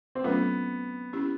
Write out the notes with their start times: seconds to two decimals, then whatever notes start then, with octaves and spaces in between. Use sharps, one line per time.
0.15 C4
0.24 F#3 A3 B3 C#4 F4 A4
1.13 C#4 E4 G4